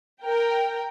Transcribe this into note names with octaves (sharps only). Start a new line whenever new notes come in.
A#4 G5